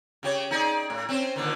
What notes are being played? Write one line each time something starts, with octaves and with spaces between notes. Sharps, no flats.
C#3 G4 C#5
D#4 G#4 D5
A2
C4 C#4 C5
A#2 D3 D#3